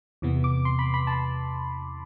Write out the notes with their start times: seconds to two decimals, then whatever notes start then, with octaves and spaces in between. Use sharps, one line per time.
0.22 E2 C3 E3 B3
0.44 D6
0.65 C6
0.79 B5
0.94 B5
1.07 A5